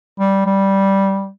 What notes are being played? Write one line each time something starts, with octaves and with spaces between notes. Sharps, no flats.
G3
G3